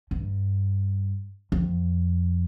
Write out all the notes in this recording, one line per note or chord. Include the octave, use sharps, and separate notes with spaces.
G2
F2